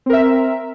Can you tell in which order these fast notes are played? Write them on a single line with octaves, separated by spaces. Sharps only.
C4 A#4 E5